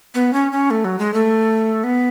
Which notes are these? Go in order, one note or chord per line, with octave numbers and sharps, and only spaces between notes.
B3
C#4
C#4
A3
F#3
G#3
A3
B3